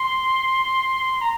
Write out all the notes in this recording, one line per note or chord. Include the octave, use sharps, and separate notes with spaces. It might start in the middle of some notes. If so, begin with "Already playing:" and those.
Already playing: C6
A#5